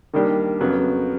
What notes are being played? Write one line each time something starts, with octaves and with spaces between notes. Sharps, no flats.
D#3 G3 A#3 D4 G4
F2 C#3 F#3 B3